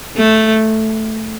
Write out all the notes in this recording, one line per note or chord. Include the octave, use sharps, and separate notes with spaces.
A3